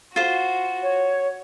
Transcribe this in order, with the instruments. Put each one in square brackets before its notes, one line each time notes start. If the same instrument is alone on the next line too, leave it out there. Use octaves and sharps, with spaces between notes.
[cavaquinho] F4 C5 [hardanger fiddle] F#4
[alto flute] C#5